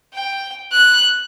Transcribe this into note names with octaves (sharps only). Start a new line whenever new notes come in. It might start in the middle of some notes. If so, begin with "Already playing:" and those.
G5
F#6